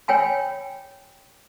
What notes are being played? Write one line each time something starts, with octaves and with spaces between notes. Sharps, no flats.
C#5 G5 G#5 B5